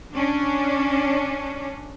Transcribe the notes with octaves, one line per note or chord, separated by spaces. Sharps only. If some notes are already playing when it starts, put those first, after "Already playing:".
C#4 D4